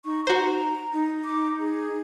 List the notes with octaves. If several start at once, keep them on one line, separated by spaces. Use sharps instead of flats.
D#4 C#6
F#4 C5 A#5
D#4
D6
G#4